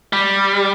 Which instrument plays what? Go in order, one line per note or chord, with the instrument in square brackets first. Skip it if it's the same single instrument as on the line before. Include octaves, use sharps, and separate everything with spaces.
[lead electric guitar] G3